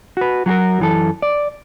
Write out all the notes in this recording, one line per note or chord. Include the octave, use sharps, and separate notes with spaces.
F#4 B4
F#3 F#4 G#4 A#4
F#2 E3 A4
D5